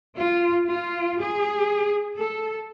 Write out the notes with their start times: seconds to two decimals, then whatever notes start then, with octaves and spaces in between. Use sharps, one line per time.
0.15 F4
0.69 F4
1.21 G#4
2.18 A4